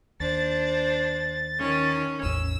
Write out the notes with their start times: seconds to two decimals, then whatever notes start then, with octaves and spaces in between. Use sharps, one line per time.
0.20 D#2 D4 C5 A6
1.59 D#3 C#4
2.23 A1 E2 C#4 E6